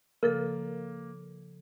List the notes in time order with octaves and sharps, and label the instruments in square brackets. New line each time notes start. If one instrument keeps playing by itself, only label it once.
[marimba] C#3 F3 A4 [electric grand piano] A#3 [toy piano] A#4